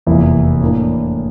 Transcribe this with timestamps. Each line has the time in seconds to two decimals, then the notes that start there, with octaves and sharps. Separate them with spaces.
0.06 F1 E2 E3 A#3 E4
0.61 A2 E3 A#3 D4